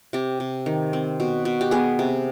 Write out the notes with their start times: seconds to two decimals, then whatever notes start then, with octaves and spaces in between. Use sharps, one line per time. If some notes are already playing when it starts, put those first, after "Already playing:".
0.13 C3 G4
0.40 C3
0.66 D#3
0.93 C4
1.20 B2
1.45 B2
1.61 G4
1.71 B3 G#4
1.99 C3